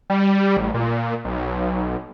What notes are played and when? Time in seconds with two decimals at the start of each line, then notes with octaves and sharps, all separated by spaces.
0.10 G3
0.57 A1
0.74 A#2
1.25 B1